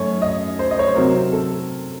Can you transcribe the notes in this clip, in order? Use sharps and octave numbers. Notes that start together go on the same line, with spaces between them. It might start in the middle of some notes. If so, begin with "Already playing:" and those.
Already playing: F#2 A3 C#5
D#5
C5
D#5
C#5
C5
C3 F#3 C4 A#4
A4